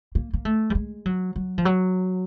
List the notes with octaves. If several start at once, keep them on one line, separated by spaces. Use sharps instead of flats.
A#3
A#3
A3
G3
G#3
F#3
F#3
F3
F#3